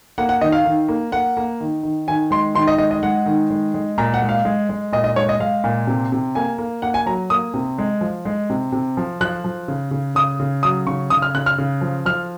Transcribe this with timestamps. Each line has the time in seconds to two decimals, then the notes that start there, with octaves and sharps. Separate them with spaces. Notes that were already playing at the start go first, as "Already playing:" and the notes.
0.18 A#3 F#5
0.29 F#5
0.41 D#3 D#5
0.52 F5
0.65 D#3
0.88 A#3
1.12 A#3 F#5
1.37 A#3
1.60 D#3
1.83 D#3
2.08 D#3 G#5
2.31 G#3 C6
2.55 D#3 C6
2.67 D#5
2.78 G#3 D#5
2.91 D#5
3.03 G#3 F#5
3.26 D#3
3.50 G#3
3.74 G#3
3.98 A#2 A#5
4.14 F#5
4.22 G#3
4.29 F5
4.45 G#3
4.69 G#3
4.93 A#2 D#5
5.04 D#5
5.16 G#3 C#5
5.29 D#5
5.40 G#3 F5
5.64 A#2
5.87 C3
6.12 C3
6.35 A#3 G#5
6.58 A#3
6.82 A#3 F#5
6.94 G#5
7.06 F#3 A#5
7.30 A#3 D#6
7.54 C3
7.78 G#3
8.01 F3
8.25 G#3
8.50 C3
8.72 C3
8.97 F3
9.21 F3 F#6
9.44 F3
9.68 C#3
9.91 C#3
10.15 C#3 D#6
10.40 C#3
10.63 F#3 D#6
10.87 C#3 C#6
11.10 C#3 D#6
11.22 F6
11.34 C#3 F#6
11.46 F6
11.58 C#3
11.81 F3
12.06 F3 F6